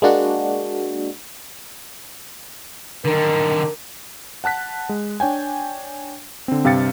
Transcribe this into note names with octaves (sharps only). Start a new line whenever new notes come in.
G#3 A#3 D4 F#4
D3 D#3 A#4
F#5 A5 F#6 B6
G#3
D4 C#5 G5 G#5
D3 C4
G2 C3 F5 G5 A6 C#7